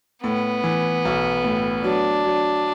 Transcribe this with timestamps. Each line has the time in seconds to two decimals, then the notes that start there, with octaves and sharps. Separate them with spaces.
0.24 A2 B3
0.64 E3
1.05 B1
1.44 A2
1.84 F#3 D4
2.25 F#3